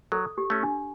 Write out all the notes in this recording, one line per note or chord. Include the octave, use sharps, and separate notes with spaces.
F#3 A4
G4
A3 C#4
D4